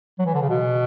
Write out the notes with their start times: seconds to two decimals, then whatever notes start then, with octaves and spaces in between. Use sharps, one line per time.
0.19 F#3
0.26 E3
0.34 D3
0.42 C#3
0.50 B2